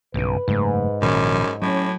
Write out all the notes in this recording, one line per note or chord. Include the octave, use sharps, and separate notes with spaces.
B1 G2 C#3 B4
F#1 G#2 A3
A#1 F#2 D#3 F3
A2 F#3 C#4